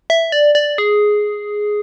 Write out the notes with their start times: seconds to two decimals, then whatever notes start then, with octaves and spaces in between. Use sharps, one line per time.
0.10 E5
0.32 D5
0.55 D5
0.78 G#4